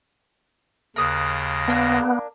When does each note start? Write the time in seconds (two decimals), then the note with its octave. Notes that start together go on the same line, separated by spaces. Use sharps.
0.96 D#2 C#3 A#4 D#6 F#6 A#6
1.68 A#3 B3 D4 A#4